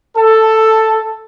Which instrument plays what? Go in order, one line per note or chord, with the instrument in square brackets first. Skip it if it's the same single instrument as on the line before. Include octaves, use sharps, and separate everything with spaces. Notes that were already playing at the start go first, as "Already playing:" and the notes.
[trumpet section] A4